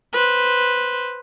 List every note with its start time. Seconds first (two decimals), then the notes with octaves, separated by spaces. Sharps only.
0.13 B4 C5